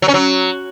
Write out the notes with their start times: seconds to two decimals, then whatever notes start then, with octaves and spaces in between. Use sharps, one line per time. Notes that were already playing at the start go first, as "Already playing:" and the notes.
0.02 F#3
0.08 C#4
0.14 F#3